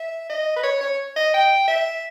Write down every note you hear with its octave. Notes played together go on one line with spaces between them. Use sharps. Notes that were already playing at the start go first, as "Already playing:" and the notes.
Already playing: E5
D#5
B4
C#5
C#5
D#5
G5
E5